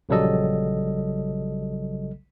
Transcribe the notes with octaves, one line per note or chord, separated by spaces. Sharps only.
A#1 C#3 F#3 G3 A4 D#5